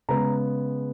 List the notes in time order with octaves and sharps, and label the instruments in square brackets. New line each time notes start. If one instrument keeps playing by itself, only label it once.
[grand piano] C#3 G#3 B3 A#5